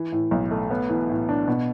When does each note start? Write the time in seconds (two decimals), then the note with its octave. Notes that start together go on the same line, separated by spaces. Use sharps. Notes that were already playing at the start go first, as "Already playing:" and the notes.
Already playing: E3
0.12 A2
0.31 B1
0.51 A3
0.71 B3
0.89 E3
1.09 A2
1.29 D4
1.48 B2